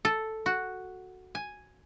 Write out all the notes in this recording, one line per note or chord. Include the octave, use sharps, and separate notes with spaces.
A4
F#4
G#5